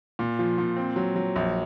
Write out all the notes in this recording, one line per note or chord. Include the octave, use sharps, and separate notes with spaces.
A#2
F3
A#2
C4
F#3
F#3
A#1